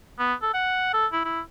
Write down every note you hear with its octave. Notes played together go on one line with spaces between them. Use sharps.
B3
A4
F#5
A4
E4
E4